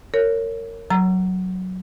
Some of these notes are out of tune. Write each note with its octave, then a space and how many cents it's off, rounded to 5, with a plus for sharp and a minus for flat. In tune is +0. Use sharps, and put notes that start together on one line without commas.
A#4 -25 C#5 +0
F#3 +0 A#5 +0 E6 +40